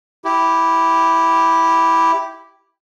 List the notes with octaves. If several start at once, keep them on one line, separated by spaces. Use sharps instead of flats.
E4 G4